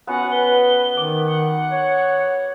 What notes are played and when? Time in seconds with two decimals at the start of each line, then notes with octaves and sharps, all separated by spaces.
0.07 B3 C#4 F#4 F#5
0.31 B4 G7
0.97 D#3 D6
1.25 F#5
1.72 C#5